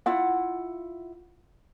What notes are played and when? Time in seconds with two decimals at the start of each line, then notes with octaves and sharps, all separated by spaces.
0.06 E4 F4 F#5